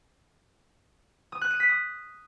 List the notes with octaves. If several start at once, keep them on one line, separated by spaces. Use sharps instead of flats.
D#6
F#6
D#7
B6
D#6